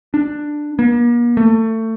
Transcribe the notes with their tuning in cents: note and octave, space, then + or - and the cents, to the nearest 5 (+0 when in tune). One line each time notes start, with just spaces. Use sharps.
D4 +10
A#3 +40
A3 +25